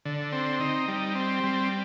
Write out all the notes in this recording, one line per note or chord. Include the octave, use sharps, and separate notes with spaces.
D3
C4
D#4
G3
C4
G3